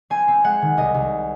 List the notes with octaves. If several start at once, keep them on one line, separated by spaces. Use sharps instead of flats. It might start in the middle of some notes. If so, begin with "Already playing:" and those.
C4 G#5
C4
G#3 F#5
D#3
C2 D#5
C2